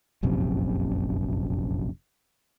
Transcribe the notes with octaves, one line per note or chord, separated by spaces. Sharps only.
F1 A#1 F#2 C3